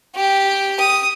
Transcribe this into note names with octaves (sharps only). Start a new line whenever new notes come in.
G4
D#6